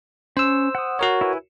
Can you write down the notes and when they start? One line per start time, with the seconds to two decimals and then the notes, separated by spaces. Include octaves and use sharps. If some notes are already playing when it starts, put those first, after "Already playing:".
0.37 C#4 C5 E6
0.75 F#5 D#6
0.99 F#4 A#4 C#5
1.21 E4 B4 G#5